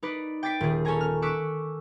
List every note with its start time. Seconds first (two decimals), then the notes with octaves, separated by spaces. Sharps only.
0.03 D#4 B4 D5
0.43 G5 D6 A6 B6 C7 D7
0.60 D#1 G#4
0.85 C#4 A4 C#5 G#5 A#5
1.01 F6
1.22 C#6 D6 E6 F#6 B6